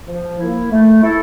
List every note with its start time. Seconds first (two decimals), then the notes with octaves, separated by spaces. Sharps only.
0.08 F3
0.39 A#3 E4
0.71 A3
1.02 E4 A4